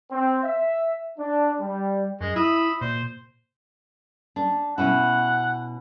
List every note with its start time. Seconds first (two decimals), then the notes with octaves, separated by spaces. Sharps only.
0.11 C4
0.44 E5
1.18 D4
1.59 G3
2.21 F#2 G#3
2.36 E4 E5 B5 D#6
2.81 A#2 C5
4.36 D4
4.78 B2 C#4 E4 F#5